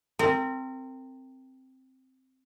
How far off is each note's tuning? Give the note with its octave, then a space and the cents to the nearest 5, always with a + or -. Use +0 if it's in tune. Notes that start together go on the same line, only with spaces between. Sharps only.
C4 +0 A#4 -35